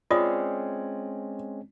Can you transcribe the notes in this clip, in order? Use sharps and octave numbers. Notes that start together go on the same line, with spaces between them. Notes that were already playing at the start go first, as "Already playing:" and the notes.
G#3 C4 C#4 F4 D5 D#5 D#6